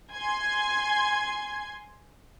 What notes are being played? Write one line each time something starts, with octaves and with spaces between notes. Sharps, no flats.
G#5 C6 G#6